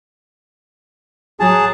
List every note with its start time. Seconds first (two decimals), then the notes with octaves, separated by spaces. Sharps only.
1.40 F#3 G#4 A5